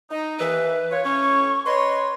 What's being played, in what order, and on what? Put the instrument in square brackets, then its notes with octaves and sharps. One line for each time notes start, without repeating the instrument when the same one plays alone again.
[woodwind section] D#4
[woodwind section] D#2 E3 E5 [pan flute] B4
[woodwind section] F4 C#5
[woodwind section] A2 C#4 C#5 [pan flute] C#6
[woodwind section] B4 C#5 C6 [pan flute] D#5